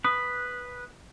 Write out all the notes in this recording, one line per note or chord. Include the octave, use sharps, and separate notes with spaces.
B4 D#6